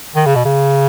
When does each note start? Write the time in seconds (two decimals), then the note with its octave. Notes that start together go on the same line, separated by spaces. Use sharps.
0.16 D#3
0.26 C#3
0.35 B2
0.45 C#3